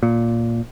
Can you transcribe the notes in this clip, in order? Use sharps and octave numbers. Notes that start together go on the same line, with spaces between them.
A#2